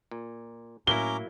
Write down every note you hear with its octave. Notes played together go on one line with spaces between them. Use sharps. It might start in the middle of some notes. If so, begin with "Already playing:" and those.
A#2
A2 F#3 A#3 C#4 E4 A#5 D6 G7